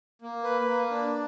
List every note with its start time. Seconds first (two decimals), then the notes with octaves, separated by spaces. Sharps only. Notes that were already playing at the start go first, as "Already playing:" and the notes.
0.22 A#3
0.44 B4
0.68 A#3
0.90 D4